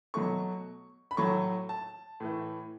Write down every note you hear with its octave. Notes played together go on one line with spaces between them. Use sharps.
B2 F#3 A3 C#6
B5
A2 F#3 A3 C#6
A5
A2 E3 A3